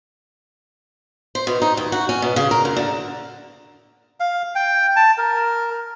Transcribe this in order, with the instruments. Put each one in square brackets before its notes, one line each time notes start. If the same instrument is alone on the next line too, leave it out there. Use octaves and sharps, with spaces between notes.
[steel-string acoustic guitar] C5
B2
D#4
D#2
F#4
C#4
B2
C#3
A#4
F#2
D3
[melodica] F5
G5
A5
A#4